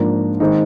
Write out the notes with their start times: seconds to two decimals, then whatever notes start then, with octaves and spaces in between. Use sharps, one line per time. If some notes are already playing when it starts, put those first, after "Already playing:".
Already playing: G#2 F3 A#3 D4
0.40 D#3 G#3 C4 D#4